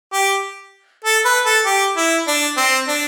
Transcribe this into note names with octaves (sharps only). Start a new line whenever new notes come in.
G4
A4
B4
A4
G4
E4
D4
C4
D4